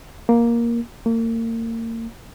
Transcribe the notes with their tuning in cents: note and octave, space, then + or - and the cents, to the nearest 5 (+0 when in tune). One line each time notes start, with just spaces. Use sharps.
A#3 +10
A#3 -35